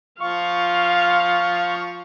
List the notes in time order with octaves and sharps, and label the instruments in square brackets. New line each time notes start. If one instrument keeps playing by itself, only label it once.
[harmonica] F3 F4 [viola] F5 [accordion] C#6